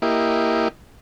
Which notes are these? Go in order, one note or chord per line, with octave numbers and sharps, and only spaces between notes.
A#3 E4 G4 D#5